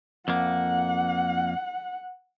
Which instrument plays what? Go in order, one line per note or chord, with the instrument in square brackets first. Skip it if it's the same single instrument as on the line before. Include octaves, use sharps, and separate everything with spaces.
[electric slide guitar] F2 A#3 [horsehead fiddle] F#5